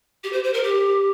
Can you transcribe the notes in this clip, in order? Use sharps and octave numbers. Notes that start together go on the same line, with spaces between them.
G4
C5
C5
A#4
G4